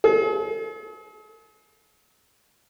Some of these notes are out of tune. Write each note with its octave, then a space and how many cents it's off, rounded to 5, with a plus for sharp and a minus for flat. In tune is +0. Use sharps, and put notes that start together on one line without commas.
G#4 +45